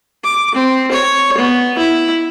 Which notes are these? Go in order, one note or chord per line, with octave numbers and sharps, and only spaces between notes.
D6
C4
C#5
B3
E4